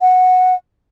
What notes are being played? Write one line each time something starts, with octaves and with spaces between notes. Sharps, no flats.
F#5